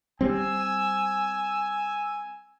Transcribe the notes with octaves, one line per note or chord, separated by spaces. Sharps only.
G3 C4 G#5 E6